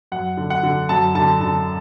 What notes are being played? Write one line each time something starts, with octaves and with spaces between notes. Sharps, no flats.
F#2 F#5
D3
F#5
D3
F#2 A5
D3 A5
D3 A5